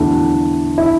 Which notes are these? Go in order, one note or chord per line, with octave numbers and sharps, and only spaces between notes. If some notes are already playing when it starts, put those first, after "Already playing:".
Already playing: E2 D3 F#3 A3 D4 E4
E4